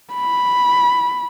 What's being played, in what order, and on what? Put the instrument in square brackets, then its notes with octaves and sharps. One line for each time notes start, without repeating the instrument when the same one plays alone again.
[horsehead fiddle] B5